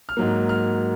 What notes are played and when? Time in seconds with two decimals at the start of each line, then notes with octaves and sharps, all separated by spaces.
0.09 F6
0.17 G#2 F#3 A#3
0.49 F6